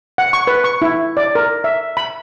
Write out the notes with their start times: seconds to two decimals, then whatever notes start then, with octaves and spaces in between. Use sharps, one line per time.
0.18 F#5
0.33 C#6
0.47 B4
0.64 C#6
0.82 E4
1.17 D5
1.35 A#4
1.64 E5
1.97 B5